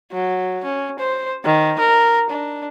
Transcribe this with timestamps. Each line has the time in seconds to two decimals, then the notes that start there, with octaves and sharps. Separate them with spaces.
0.11 F#3
0.64 C#4
0.99 C5
1.44 D#3
1.79 A#4
2.30 D4